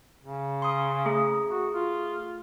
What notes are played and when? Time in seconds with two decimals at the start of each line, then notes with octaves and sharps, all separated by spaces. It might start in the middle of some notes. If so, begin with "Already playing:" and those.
0.24 C#3
0.62 C6 D#6
1.06 A3 G#4
1.50 F#4
1.73 F4